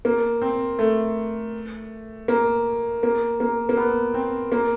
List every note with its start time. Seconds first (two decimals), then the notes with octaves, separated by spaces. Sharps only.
0.05 A#3
0.42 C4
0.79 A3
2.28 A#3
3.03 A#3
3.40 A#3
3.69 A#3
3.77 B3
4.14 C4
4.52 A#3